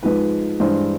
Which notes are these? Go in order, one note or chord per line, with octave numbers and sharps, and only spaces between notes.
G#2 F3 G#3 B4
G2 E3 G#3 C5